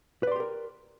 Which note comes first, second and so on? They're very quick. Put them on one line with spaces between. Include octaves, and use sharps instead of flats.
B4 D5 C6 G4 A#4